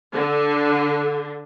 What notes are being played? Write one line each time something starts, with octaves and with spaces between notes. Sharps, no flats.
D3